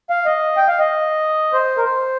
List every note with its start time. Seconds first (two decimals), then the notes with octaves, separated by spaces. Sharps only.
0.10 F5
0.26 D#5
0.57 G5
0.68 F5
0.79 D#5
1.53 C5
1.78 A#4
1.85 C5